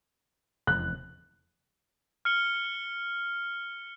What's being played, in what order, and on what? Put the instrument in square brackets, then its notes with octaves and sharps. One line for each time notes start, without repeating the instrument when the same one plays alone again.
[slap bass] F1 E2 [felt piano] F#6
[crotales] F6 C#7 G7